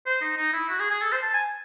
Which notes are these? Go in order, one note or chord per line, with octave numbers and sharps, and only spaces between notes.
C5
D#4
D#4
E4
F#4
G#4
G#4
A4
C5
A5
G#5